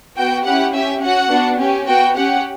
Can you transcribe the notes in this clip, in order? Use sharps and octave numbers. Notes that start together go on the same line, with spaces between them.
B3 F#4 G5
C#4 E4 G4 F#5
C#4 G4 E5
C#4 F#4 F#5
B3 D4 F#4
C#4 G4
B3 F#4 G5
C#4 G4 F#5